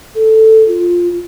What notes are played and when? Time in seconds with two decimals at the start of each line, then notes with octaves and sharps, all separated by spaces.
0.15 A4
0.68 F4